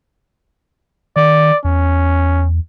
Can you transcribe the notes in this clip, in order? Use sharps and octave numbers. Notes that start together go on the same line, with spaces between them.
D#3 D5
E2 C#4